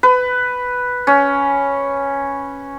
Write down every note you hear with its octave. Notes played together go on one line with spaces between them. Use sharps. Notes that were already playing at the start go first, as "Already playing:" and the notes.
B4
C#4